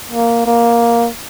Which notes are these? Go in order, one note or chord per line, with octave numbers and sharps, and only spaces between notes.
A#3
A#3